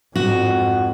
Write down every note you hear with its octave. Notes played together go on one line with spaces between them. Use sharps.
F2 G#2 F#4